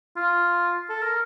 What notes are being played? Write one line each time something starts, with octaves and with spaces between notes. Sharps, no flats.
F4
A4
A#4